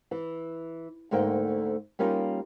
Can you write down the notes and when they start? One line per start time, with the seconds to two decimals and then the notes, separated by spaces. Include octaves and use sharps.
0.11 E3
1.11 D2 G#2 A3 A#3 G5
1.99 G3 A#3 C#4 D#4 F4